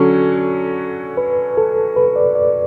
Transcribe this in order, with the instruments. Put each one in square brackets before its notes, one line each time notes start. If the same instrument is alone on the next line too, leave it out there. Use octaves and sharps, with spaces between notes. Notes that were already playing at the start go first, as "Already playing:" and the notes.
Already playing: [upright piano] D3 F#3 C#4 [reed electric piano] A4
[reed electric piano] B4
A4
B4
D5
D5